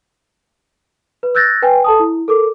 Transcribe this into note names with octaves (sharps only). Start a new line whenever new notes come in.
B4
E6 F#6 G6 A6 A#6
B4 G5 G#5
A4 A5 D#6
E4
A4 A#4 D6